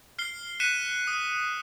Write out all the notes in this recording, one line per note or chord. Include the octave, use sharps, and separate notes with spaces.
F6 C7 G7
F#6 B6 C#7 D#7 E7
D#6